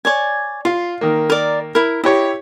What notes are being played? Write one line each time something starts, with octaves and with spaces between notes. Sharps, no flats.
C#5 D5 G#5
F4 F5
D#3 A#3
A#4 D5
E4 A#4
E4 G4 C#5 D#5